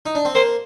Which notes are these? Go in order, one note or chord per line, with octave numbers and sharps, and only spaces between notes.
D#4
D4
C4
A#3 C5